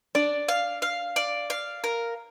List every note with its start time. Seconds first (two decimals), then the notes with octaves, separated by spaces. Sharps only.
0.15 D4 D5
0.48 F5
0.82 F5
1.16 D5
1.50 F5
1.84 A#4